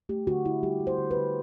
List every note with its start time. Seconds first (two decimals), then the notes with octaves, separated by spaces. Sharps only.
0.09 A3 G4
0.27 D3 F#4
0.45 D3 E4
0.63 G3 G4
0.80 G3
0.87 C5
0.98 D3
1.11 B4
1.16 D3